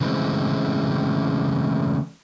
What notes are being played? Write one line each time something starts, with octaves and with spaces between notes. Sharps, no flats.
C#3 E3 G#3 A3 C4